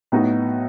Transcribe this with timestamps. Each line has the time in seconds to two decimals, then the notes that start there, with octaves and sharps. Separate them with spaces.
0.12 A2 F#3 B3 D#4 F#4